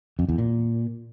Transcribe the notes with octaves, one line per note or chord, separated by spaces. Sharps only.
F2
E2
A#2